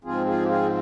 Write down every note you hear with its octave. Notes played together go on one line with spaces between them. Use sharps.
G#2 F3 C4 F4 G#4
F4 G#4
G4
F4 G#4